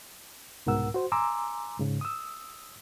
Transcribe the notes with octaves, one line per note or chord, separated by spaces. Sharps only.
C2 G#2 B2 A#4 F#5 E6
F#4 C5
G#5 A#5 C6 D6 E6
G#2 C#3
D#6 E6